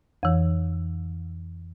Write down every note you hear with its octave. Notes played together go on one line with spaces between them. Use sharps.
F2 E3